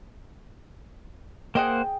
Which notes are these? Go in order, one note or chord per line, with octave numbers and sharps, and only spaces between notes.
A#3 G#4 C5 D#5 F#5 G5